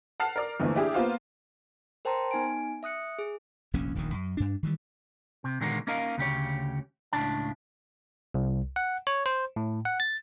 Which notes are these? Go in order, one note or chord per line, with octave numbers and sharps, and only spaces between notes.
F#5 A5 F6 C7
A#4 D5 F6
E2 D3 E3 F3 A3 A#3
D4 E4 G4 G#4
A#3 B3 F4 C5 F5
A#4 C5 G5 A5 A#5 C6
B3 D#4 G#5 D7
E5 D#6 F#6 C#7
G#4
F1 A#1 D#2 C#4
D#1 A#1 E2 D#3
F#2
G2 D4
D#3 E3 G3
C3
A#2 D3 D#3 G#3 A#3 B3
A#3 C#4 D#4 A#4 D#5 F5
D2 C#3 G4 C#5
C#2 A2 C#3 D4 A5
C2
F#5
C#5
C5
A2
F#5
A6